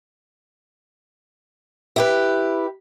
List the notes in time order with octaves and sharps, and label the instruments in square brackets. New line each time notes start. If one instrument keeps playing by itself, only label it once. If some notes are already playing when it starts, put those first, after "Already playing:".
[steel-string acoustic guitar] E4 G4 B4